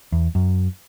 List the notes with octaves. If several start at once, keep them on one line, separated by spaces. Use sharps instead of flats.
E2
F#2